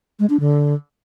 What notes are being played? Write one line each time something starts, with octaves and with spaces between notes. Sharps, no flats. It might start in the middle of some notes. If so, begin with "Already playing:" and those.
G#3
D4
D3